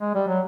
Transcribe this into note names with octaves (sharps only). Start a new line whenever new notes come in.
G#3
G3
F#3